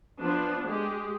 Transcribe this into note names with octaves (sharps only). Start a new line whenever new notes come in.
F3 B3 D4 F4
G#3 G4